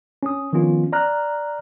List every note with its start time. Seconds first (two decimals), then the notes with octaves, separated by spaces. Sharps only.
0.23 C#4 D#6
0.53 D#3 F3 B3 C#4 F4
0.92 D5 A#5 F6 F#6